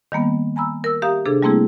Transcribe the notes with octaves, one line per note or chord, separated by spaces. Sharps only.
D#3 G3 A#3 B3
G#5 A#5 B5 E6
A#4 E6
G4 E5 F5 A#5 D#6
C3 D4 G#4 A4
G3 A3 A#3 C4 E4 G#4